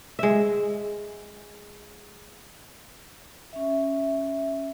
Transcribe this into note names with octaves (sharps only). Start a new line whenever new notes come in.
G#3 E5
C#4 E5